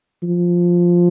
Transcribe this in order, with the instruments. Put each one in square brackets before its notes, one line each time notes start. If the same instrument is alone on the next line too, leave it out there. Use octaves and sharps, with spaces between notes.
[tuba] F3